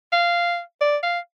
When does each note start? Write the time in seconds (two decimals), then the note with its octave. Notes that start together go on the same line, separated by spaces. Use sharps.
0.12 F5
0.81 D5
1.03 F5